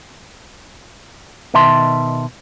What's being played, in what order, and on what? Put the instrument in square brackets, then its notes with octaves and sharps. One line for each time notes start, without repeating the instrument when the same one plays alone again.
[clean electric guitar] B2 D#3 E5 A5 C6